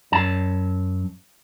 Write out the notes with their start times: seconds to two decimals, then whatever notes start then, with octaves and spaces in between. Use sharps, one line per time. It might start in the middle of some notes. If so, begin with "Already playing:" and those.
0.12 F#2 A5